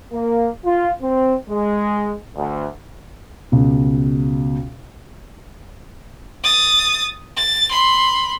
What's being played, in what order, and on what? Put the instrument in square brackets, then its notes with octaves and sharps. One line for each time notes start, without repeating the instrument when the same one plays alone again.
[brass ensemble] A#3
F4
C4
G#3
D2
[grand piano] C#2 B2
[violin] D#6 A6
A6
B5 C6